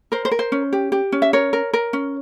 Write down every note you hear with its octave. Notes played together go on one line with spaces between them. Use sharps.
A#4 C5
C5
A#4
C5
C#4
G4
G4
C#4
E5
A#4 C#5
A#4
A#4
C#4